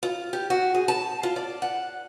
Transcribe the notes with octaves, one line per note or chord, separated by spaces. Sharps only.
F4
G4
F#4
G#4
A5
F4
D5
F#5